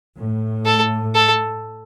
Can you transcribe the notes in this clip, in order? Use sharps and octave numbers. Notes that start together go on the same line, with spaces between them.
A2
A4
A4